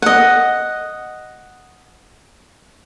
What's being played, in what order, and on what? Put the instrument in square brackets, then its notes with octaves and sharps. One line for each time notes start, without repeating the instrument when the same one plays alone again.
[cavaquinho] D#5 F#5